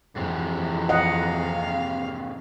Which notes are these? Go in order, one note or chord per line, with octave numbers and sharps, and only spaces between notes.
F2 G#2 C3 E3
D#5 F5 F#5